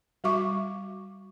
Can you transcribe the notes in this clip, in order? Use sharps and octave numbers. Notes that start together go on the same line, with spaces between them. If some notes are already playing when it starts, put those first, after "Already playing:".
G3 F#4 E5 C#6 D6